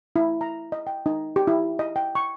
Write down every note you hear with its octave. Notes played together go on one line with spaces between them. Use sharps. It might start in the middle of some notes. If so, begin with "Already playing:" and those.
E4
A#5
D#5
G5
D#4
G4
E4
D#5
G5
C#6